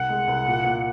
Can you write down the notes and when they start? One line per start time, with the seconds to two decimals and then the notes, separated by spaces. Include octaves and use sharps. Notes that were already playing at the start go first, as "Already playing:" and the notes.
Already playing: C2 F#5
0.09 G#3
0.27 C2
0.46 A#2
0.64 A#2